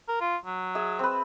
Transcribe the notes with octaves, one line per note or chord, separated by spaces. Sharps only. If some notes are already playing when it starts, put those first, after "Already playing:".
A#4
F4
F#3
G#4 E5
C4 B4